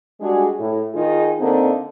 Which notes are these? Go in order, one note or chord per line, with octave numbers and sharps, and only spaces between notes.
G3 G#3 D4 F#4 G#4
A2
D#3 D#4 F4 G#4
D3 A#3 C4 D#4